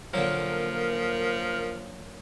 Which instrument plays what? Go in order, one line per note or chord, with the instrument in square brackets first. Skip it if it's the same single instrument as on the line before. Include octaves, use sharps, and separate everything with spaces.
[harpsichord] A#2 D3 F#3 [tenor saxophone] F3 [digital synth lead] A#4